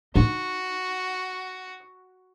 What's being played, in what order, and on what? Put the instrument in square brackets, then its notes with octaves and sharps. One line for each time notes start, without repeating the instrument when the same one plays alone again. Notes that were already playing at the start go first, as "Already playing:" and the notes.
[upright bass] D#4 [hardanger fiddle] F#4